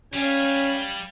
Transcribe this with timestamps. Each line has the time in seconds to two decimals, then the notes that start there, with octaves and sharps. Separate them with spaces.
0.14 G3 C#4 F5 G#5